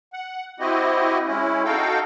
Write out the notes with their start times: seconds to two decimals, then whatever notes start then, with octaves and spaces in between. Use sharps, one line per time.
0.13 F#5
0.60 C4 E4 F#4 G4 D#5
1.27 G#3 C#4 E4
1.64 D#4 F#4 A4 F5 G5